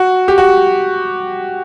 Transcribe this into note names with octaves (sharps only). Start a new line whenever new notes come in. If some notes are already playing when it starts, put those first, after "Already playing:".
Already playing: F#4
G4
F#4